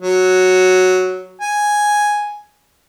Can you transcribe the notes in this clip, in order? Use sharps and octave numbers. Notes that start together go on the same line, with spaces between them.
F#3
G#5